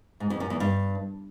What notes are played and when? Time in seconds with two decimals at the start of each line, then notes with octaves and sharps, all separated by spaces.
0.20 G#2
0.30 F2
0.40 F#2
0.50 E2
0.60 G2